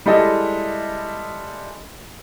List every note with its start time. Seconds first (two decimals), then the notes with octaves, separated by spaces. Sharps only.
0.06 G3 G#3 E4 A4 D#5 E5